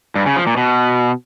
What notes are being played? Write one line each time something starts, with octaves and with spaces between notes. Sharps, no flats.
G2
C#3
F3
A#2
B2